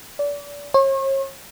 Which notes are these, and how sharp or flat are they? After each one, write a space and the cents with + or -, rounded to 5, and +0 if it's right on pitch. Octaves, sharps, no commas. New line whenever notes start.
D5 -30
C#5 -40